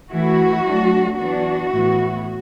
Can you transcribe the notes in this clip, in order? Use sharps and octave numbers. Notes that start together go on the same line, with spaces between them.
E3 A3 E4 F#4
F#3 A3 D4
E3 B3 D4 F#4
A2 E3 B3 E4